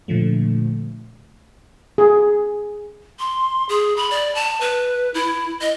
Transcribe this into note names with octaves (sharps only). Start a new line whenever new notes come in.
A#2 D3 F3 A3
G#4
C6
G#4
B5
D5
A5
B4
E4
D#5